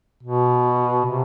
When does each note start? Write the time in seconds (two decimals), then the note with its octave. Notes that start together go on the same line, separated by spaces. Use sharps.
0.23 B2
1.05 C3